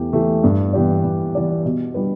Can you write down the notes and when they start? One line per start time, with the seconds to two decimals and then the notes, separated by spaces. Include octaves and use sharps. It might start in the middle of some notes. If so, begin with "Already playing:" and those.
Already playing: E2 E3 A3 G4
0.13 E3 A3 G4
0.44 G2
0.73 E3 B3 G4 D5
1.04 G2
1.35 E3 B3 G4 D5
1.65 B2
1.94 G3 D4 B4